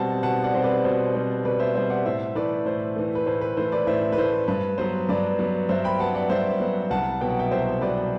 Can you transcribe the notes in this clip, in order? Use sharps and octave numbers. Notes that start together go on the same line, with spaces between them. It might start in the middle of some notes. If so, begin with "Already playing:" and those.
Already playing: B2 G3 C4 F#5 A5
B2 F#5 A5
D5 F#5
G3 C4 C5
B4 D5
B2 C5
G3 C4
B2 B4 D5
C5 E5
G3 C4 C5 E5
D5 F#5
A2 C5 E5
E3 A3 B4 D5
A2 C5
E3 A3
B4
A2 C5
B4
E3 A3 C5
B4 D5
A2 C5 E5
B4
E3 A3 C5
G2 B4
F#3 B3 C5
G2 B4 D5
F#3 B3
G2 C5 E5
G5 B5
F#3 B3 F#5 A5
D5 F#5
G2 C5 E5
F#3 B3
C2 F#5 A5
B2 F#3 B3 G5
F#5
E5 G5
C2 C5 E5
B2 F#3 B3 B4 D5